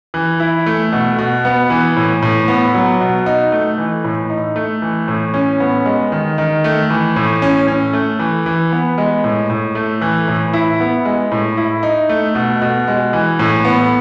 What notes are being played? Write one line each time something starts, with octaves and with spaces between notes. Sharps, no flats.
E3
E4
A3
B2
B2
B3
E3
A2
A2
B3
F#3
B2
D#4
A3
E3
A2
D#4
A3
E3
A2
C#4
B3
G#3
D#3
D#3
A3
E3
A2
C#4
C#4
A3
E3
E3
B3
G#3
A2
A2
A3
E3
A2
E4
B3
G#3
A2
E4
D#4
A3
B2
B2
G#3
E3
A2
B3